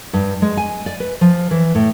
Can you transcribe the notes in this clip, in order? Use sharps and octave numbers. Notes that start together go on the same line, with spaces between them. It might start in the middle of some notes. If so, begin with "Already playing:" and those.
G2
G#3
G#5
D5
B4
F3
E3
A2